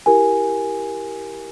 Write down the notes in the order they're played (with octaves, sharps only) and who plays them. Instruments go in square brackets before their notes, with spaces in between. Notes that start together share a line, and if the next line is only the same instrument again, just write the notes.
[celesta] E4 G4 A#4 G#5